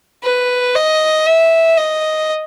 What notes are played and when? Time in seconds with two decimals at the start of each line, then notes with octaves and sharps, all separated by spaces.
0.23 B4
0.75 D#5
1.26 E5
1.77 D#5